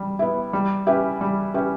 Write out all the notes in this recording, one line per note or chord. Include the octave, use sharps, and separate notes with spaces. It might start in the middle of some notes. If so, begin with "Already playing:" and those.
Already playing: G3
B3 E4
G3
C#4 E4 G4 B4
G3
C#4 E4 G4 B4